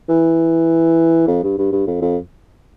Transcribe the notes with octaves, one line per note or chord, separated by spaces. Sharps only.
E3
F2
G2
G2
G2
F2
F2